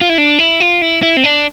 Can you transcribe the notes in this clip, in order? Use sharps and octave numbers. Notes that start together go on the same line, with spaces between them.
F4
E4
D4
E4
F4
E4
E4
C4
D4